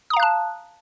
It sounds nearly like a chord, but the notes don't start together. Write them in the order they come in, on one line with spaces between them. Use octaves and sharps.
D#6 A#5 F5 F#6 A5